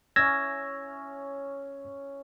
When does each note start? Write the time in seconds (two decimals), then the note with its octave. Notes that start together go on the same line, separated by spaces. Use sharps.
0.16 C#4 E4 E5 E6 G#6 A#6